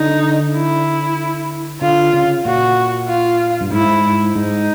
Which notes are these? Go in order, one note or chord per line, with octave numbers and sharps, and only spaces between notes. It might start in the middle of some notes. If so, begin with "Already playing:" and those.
Already playing: D3 D#4
E4
D3 F4
C#3
A#2 F#4
F4
G2
G#2 E4
G#2 D#4